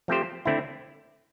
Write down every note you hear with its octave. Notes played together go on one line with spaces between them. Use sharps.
F3 A3 C4 G4 C5
D3 A3 C4 E4